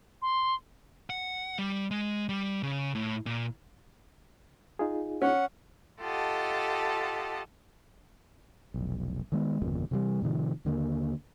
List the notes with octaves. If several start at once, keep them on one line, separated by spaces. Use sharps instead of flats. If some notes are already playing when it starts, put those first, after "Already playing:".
C6
F#5
G3
G#3
G3
C#3
A2
A#2
D#4 F4 G#4
C#4 F#5
F4 G4 A4 D#5 F#5 A5
F1 B1
D#3 G#3 B3
G1 E2 A#2 C#3
C3 E3 F#3 G3
A2 C3 D#3 F3
D#2 D3 G#3 A#3